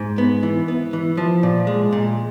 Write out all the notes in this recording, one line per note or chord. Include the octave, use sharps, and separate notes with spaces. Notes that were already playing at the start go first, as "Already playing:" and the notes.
Already playing: G#2
B3
E3
B3
E3
F3
A#2
G#3
A#2